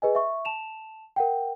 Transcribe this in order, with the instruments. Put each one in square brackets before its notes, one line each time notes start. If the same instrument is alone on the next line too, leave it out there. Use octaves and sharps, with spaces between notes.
[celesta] G#4 B4 D#5 G#5
E5 C#6
A5 E7 F7
A#4 F#5 G5